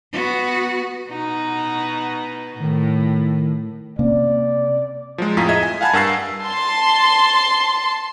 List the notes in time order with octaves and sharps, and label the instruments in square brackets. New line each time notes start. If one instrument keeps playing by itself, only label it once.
[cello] B3 F#4
[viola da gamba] B2 D#4 F#4
[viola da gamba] A2 [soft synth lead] D#3
[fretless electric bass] C3 A#3 C#4 [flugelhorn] D5
[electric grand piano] F3 F#3 G#3
F2 A2 F4 G#4 A#5 B6
D#5 E5 G#6
G#5
F5 F#5 G#5 A5 B5 G#6
G2 A#4 F#5 E6 A6 C7
[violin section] A5 C6